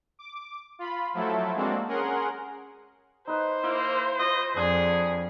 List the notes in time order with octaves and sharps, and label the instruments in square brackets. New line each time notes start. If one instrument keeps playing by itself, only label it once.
[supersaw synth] D6
F4 B5
F3 F#3 A3 E4 A4
G#3 A#3 C4 D4 F#4 A4
C#4 G#4 A#4 F#5 C6
[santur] D#4 B4 [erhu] C5
[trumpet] A#3 [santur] E4
[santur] F4 E6 [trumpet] D#5
[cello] F2 [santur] D4 F5 [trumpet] G#4